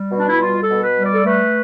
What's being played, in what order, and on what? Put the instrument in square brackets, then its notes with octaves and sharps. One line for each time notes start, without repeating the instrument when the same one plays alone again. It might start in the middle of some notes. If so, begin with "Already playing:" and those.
Already playing: [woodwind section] G3
B2
D4
E4
G3 F4
A4
B2
B4
G3
D5
A4
A3 B4